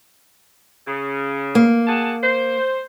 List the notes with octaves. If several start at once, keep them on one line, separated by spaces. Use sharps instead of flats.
C#3
A#3
G#4 F#5 A5
C5